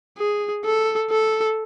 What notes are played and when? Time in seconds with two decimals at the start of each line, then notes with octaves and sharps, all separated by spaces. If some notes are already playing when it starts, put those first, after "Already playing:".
0.18 G#4
0.65 A4
1.11 A4